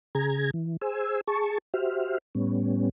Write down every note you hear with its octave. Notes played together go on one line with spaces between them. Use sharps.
C#3 G#4 A#5 G#6
E3
G#4 C5 G#5 E6
G#4 A5 C#6
F#4 G4 C5 E5 F6
A2 G3 B3 C#4